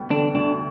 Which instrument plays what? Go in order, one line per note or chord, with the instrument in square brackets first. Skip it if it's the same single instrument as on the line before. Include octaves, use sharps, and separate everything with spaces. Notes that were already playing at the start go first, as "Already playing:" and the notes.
Already playing: [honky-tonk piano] D2 G3 B3
[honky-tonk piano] D3 [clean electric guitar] D4
[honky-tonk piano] D2 [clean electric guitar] D4